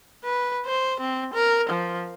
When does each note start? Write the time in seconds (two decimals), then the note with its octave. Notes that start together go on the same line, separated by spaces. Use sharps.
0.24 B4
0.66 C5
1.01 C4
1.34 A#4
1.70 F3